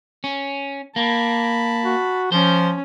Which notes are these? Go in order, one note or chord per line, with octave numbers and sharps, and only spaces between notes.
C#4
A#3 A5 B5
F#4
F3 C#4 C5